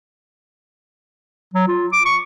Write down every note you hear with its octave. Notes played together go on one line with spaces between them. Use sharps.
F#3
F4
D6
C#6